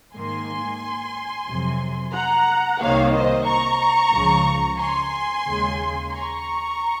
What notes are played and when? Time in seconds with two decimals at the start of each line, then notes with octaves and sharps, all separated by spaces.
0.15 G#2 D#3 A#3 G#5 C6
1.48 F2 C3 F#3
2.14 F#5 A#5
2.81 C2 C3 D#3 A#3 C#5 F5
3.13 C5 D#5
3.47 A#5 C#6
4.13 C#2 C#3 F3
4.79 G#5 C6
5.46 D#2 C#3 G#3
6.12 A#5 C#6